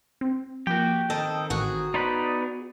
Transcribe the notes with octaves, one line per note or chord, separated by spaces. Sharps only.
C4
F3 A#3 F#4 G4 G5
D#3 C4 A4 D#5
A1 F#4 G#4 F#6
B3 D#4 C5 D5 F#5 B5